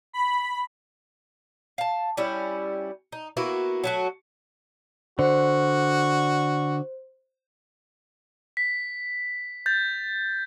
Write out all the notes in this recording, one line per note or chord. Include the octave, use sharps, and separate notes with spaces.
B5
F5 A5
G3 C#4 E4
D#4
A#3 B3 E4 F#4
F#3 A3 F#4
D3 F#4 C5
B6
G6 A6